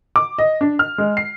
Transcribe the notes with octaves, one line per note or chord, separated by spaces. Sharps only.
D6
D#5
D4
F6
G#3
C7